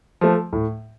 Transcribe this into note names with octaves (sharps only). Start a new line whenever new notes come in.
F3 A3
A2